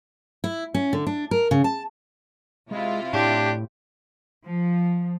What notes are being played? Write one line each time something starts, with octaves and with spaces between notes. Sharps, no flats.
E4
C#4
D3
D4
A#4
C#3
A5
C3 G#3 E4 F4
A2 D4 G4
F3